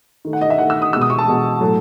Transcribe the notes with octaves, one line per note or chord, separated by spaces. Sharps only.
D#3 A3
F#5
D#5
E5
D#3 A3 F#5
E6
D#6
B2 G#3 E6
D#6
C#6
A5
B2 G#3
A2 F#3 A3